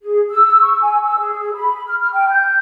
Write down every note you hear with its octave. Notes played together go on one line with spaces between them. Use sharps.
G#4
E6
C#6
G#5
E6
G#4
B5
F6
F6
G5
G6